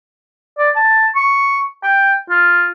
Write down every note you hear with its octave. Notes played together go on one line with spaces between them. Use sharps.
D5
A5
C#6
G5
F4